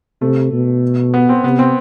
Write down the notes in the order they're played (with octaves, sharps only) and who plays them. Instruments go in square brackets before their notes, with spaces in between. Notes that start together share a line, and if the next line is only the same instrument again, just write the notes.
[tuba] C3 [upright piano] A3
[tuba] B2
[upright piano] B3
C4
[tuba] C3 [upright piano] B3
[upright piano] C4